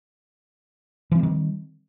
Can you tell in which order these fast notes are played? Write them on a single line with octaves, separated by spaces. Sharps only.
E3 C4 G3 D#3